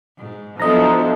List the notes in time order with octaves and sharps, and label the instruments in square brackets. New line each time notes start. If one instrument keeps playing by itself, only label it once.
[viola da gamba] G#2
[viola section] F3 D4 A4 [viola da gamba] F#3 B3 E4 [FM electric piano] D#5 A#5